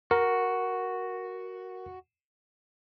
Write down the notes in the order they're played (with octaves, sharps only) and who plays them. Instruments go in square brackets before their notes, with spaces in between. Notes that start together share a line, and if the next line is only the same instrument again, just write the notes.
[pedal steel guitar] F#4 [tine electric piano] A#4